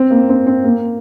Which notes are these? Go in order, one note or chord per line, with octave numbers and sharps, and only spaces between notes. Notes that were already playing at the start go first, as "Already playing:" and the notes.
Already playing: C4
A#3
C4
C4
A#3